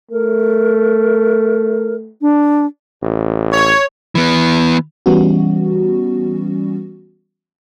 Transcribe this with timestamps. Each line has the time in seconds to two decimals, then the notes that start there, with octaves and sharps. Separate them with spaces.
0.11 A3 A#4
2.21 D4
3.02 A1
3.52 C#5
4.15 E3 B3
5.06 E3 G3 B3 C#4 F#4